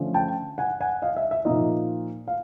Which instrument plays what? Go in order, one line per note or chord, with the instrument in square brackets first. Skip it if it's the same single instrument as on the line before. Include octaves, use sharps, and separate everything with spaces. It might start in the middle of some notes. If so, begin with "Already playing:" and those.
Already playing: [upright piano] D3 F3 A3 C#4
G5 A5
F#5 G#5
F#5 G#5
D#5 F5
E5
E5
A#2 F3 A#3 D#4 D#5
F5